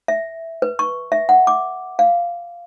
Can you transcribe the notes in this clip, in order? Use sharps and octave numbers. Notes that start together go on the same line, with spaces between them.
E5
B4
C#6
E5
F#5
D6
F5